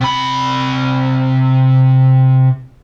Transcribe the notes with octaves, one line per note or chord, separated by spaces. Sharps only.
C3 B5